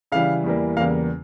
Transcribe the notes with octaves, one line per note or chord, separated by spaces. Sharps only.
C#3 E3 G3 F5
E2 E3 G3 A#3
E2 C#3 G3 A#3 F5